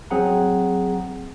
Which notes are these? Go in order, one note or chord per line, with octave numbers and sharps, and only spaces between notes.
F#3 C4 G#4 F#5 A#5